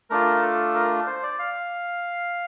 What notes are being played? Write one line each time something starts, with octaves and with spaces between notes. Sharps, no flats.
A3 D4 F4 A#4
A4
A#4
C5
D5
F5